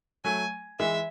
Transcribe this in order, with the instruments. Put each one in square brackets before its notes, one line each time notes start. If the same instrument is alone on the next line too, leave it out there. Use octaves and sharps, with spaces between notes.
[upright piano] F#3 A3 [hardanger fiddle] G#5
[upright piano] E3 G#3 [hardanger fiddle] E5